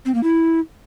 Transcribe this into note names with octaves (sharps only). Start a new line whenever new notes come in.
C4
A#3
E4